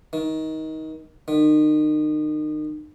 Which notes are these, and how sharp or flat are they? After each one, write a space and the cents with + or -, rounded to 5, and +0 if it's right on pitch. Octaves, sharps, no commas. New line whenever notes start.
D#3 +20
D#3 -35